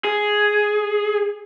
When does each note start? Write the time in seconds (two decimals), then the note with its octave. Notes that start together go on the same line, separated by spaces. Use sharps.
0.04 G#4